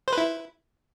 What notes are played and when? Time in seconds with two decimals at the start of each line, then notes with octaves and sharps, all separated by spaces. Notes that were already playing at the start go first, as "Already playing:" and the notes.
0.08 C5
0.13 B4
0.18 E4